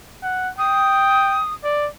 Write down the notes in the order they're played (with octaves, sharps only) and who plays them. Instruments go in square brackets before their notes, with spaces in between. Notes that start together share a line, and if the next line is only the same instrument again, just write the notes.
[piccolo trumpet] F#5
[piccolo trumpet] G5 [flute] D#6
[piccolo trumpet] D5